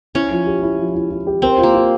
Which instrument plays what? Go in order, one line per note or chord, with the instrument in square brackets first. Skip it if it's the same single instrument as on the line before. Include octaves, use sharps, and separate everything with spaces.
[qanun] C#4 [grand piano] E4
[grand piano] F3
G4
E4
F3
E4
E4
G4
[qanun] C4 [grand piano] A#4
[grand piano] F4
[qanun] A#3
[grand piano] F4